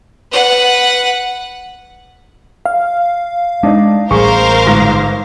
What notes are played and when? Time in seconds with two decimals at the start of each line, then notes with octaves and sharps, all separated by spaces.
0.32 B4 F#5
2.66 F5
3.63 G#3 D4 D#4
4.11 A1 G3 G#4 A#4 C5 F5 C#6
4.66 G1 G#2 A#6